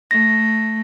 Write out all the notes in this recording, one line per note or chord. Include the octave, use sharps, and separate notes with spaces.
A3 A#6